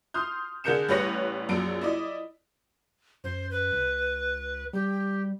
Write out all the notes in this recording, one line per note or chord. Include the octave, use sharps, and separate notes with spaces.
C6 D#6 F6 G6
D3 G#4 A#4 G6 C#7 E7
A1 G3 B4 C#5 A#6 C#7
A#1 F#2 D7
E4 D5 D#5
F#2 C5
B4
C#2
G3 G4